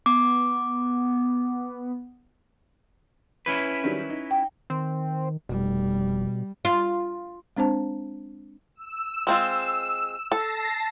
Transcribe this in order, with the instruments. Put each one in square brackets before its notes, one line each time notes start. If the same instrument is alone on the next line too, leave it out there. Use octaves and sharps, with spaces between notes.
[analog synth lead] B3 [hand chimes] D6
[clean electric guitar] C#4 E4 B4
[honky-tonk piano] D#3 F#3 G3
D#4
[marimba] G5
[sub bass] D#3 [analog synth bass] C4
[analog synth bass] F1 [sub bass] B2 [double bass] G3
[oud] F4
[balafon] G#3 C4 D4 C5 A5
[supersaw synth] E6
[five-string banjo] G#3 C4 F4
[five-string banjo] A4 [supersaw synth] A5 A#6 C7